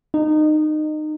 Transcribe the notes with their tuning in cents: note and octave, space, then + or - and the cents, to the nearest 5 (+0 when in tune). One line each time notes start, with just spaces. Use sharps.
D#4 -25